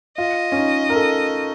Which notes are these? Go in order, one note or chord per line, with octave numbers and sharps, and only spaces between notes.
F4 D#5
C#4
D#4
A#4
A4